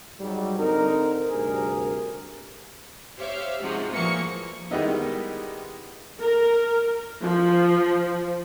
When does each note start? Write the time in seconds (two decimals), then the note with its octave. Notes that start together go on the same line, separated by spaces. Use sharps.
0.18 G#2 F#3 G3
0.58 D3 C4 D#4 A#4
1.30 D2 G2 C3 G#4 A#4
3.17 G4 C5 C#5 E5 F5
3.61 G#2 C3 F3 G#3 F#4
3.93 A#2 E3 F3 A#3 C#6 C#7
4.71 D#3 G3 G#3 B3 D#4 E4
6.22 A#4
7.22 F3